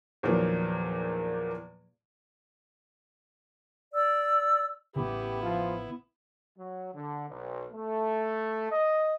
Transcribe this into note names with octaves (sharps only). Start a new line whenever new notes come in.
E2 A#2 D#3 F3 F#3 A#3
D5 E6
A1 C#3 B3 E4 G4
F3 F4
F#3
D3
B1
A3
D#5